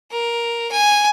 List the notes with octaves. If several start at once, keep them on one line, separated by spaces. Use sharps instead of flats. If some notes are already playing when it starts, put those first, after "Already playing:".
A#4
G#5